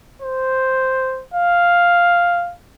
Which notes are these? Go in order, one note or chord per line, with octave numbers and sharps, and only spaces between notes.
C5
F5